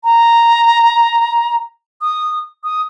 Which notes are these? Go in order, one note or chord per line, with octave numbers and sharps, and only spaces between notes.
A#5
D#6
D#6